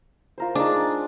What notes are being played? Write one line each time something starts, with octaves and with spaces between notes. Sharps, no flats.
F4 A#4 C5
G#3 D4 D#4